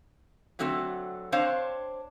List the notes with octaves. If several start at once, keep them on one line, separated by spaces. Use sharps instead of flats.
D3 F#3 A3 C4 F#4
C4 D4 C5 C#5 F5